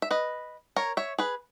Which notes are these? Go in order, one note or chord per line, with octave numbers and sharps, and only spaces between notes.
E5
B4 D#5
A#4 C#5
C#5 E5
G#4 B4